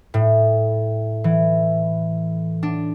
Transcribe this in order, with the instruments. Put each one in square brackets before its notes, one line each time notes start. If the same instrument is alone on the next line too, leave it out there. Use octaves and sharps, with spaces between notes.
[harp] A2
E3
D4